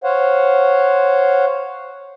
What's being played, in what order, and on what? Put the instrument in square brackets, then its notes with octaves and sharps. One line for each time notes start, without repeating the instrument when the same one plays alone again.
[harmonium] C5 C#5 F5 F#5